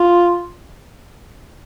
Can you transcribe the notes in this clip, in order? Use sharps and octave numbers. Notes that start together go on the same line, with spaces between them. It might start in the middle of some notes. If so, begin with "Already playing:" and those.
Already playing: F4